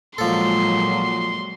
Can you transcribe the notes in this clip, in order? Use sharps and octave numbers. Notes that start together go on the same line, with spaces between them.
A#2 F3 F#3 G#3 A4 C6